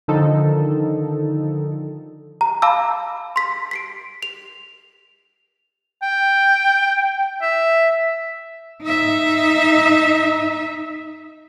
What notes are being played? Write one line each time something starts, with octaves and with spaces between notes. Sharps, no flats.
D3 D#3 F3 D#4 A4
A#5
F5 A5 B5 D6 E6
C6 B6
B6 C7 D7
F7
G5
E5
D#4 E5